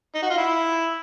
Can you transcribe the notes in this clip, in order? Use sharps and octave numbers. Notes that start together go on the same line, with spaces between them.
D#4
F#4
F4
E4